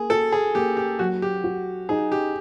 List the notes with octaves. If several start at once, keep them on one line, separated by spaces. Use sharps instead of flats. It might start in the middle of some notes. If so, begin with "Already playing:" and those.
Already playing: A#3 G#4
F#4 A4
G#4
A#3 G4
G4
F#3 F#4
G4
F#4
D#4 G#4
G4